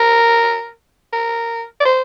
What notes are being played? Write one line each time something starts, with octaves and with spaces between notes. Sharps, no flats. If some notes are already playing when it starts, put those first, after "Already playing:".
Already playing: A#4
A#4
D5
C5